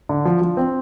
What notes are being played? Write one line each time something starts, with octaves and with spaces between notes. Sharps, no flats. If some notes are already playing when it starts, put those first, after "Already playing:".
D3
F3
F3
C4